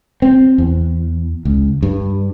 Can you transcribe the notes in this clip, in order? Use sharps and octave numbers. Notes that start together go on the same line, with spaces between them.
C4
E2
C#2
G2